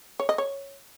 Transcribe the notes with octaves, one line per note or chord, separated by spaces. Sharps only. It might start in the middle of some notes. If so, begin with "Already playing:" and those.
C#5
D#5
C#5